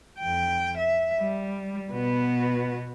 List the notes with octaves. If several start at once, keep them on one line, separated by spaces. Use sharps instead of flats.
F2 G5
E5
G3
B2 B3